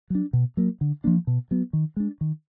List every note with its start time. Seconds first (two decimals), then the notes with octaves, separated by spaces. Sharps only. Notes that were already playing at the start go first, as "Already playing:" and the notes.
0.10 F#3 D4
0.33 B2
0.57 F#3 A#3
0.81 D3
1.04 F3 A#3 D4
1.27 B2
1.51 F#3 B3
1.73 D#3
1.96 G#3 D4
2.21 D#3